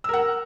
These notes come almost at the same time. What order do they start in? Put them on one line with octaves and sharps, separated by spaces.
E6 A#4 F#5